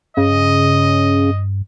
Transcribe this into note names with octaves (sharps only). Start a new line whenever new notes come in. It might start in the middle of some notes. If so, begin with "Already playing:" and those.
G2 C#3 D#5